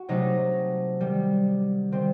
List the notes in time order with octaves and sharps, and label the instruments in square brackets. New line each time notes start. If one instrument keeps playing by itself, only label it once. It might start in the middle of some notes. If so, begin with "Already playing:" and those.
Already playing: [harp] F#4
C3 F#3 A3 D#4
D#3 G3
D#3 G3 C4